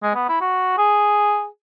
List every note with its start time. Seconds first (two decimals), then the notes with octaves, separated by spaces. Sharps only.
0.03 G#3
0.14 B3
0.28 E4
0.41 F#4
0.78 G#4